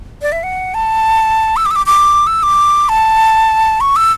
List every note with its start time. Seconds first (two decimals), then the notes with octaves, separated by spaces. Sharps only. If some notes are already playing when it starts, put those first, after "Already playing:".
0.22 D5
0.32 E5
0.43 F#5
0.74 A5
1.57 E6
1.66 D6
1.71 E6
1.76 D6
1.86 D6
2.27 E6
2.43 D6
2.89 A5
3.81 C#6
3.96 E6